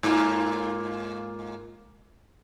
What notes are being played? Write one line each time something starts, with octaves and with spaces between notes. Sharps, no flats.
G#2 A#3 F4